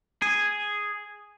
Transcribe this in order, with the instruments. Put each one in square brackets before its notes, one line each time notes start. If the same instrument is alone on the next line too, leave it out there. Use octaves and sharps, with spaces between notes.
[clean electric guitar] G#4